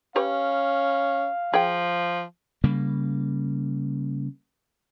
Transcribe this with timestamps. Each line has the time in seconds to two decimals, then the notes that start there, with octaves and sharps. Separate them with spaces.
0.16 C#4 G4 B4 C#5 F5
1.54 F3 G#4 G5
2.64 C#3 G3 A#3